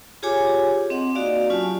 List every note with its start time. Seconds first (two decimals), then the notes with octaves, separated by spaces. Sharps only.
0.23 F4 G4 G#4 C#5 G#5 D6
0.90 C4 D#5 F#5
1.15 A#3 D#4 F#4 D5 F5
1.49 F#3 C#4 F4 G4 G#5 A5